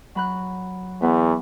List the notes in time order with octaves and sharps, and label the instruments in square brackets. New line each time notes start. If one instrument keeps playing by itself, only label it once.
[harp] F#3 B5 F#6
[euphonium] E2 [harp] B3